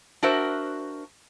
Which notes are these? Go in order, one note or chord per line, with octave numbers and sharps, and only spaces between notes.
D4 F#4 A#4 C5 E5